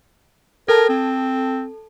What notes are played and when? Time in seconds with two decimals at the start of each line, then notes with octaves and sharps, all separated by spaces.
0.68 A4 A#4 A5
0.89 C4